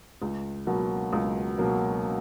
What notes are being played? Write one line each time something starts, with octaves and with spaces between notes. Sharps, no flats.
C#2
B2 F#3 A#3
C#2
B2 F#3 A#3